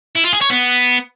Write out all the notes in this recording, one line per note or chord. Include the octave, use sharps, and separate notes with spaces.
E4
F4
G#4
C#5
B3